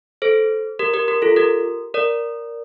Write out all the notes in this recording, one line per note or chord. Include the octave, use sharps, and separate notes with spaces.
A4 C5
G4 A#4
G4 A#4
G4 A#4
F4 A4
G4 A#4
A#4 D5